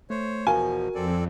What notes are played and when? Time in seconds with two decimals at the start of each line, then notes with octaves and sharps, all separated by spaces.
0.10 A3 C5 C#5
0.47 E2 B2 F3 F#4 A#4 G#5
0.95 F2 C4 A4 D5